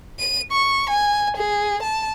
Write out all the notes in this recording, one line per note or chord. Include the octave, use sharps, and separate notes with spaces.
D#7
C#6
G#5
G#4
A5